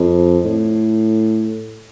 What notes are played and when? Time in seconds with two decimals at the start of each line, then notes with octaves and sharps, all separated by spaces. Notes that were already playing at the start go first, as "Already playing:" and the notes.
Already playing: F2
0.45 A2